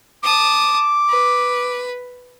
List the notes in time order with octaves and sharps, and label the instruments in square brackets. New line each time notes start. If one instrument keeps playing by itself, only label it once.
[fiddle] A5 D#6 [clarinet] D6
[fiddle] B4